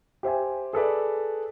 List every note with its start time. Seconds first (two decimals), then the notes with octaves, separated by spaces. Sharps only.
0.23 G4 C5 E5 G#5
0.73 G#4 A4 B4 D5